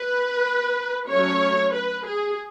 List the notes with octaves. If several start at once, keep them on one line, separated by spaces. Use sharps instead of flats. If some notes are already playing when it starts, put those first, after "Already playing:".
Already playing: B4
F#3 A3 C#4 C#5
B4
G#4